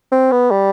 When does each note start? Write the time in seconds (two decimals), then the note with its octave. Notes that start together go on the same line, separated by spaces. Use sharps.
0.12 C4
0.32 B3
0.51 G3